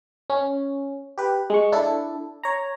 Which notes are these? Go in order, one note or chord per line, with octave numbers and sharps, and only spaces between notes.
C#4
G4 B4
G#3 C#6
D4 E4 A4
C#5 A#5